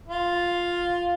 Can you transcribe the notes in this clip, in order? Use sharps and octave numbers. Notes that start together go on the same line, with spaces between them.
F4